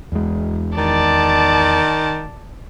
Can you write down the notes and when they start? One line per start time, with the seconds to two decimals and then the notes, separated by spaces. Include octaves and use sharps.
0.12 E2 G#3
0.78 D#3 D5 A5